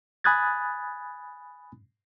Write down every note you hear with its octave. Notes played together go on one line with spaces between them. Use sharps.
G#5 B5 D#6 F#6 G#6 A6